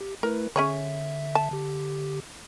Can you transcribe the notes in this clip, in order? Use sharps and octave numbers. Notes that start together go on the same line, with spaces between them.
G4
A3 E4 A#4 B4
D3 C#4 G#4 C#5 E5
A5
D3 G4